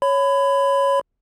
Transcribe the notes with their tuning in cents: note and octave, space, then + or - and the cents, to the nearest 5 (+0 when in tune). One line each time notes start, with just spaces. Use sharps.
C#5 +0 B5 +25